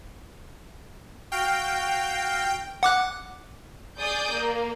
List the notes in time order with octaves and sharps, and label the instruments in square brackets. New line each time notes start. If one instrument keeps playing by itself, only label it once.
[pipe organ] F#4 F5 F6 [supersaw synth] G5
[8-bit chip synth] F#5 D6 F#6
[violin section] G#4 D5 D#6 G6
A#3